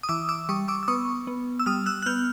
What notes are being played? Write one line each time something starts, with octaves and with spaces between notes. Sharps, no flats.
D#6
E3 D6 E6
D6 E6
G3 C#6 D#6
D6 E6
E6
B3 C#6 D#6
B3
E6
G3 D#6 F6
E6 F#6
F#6
B3 F6 G6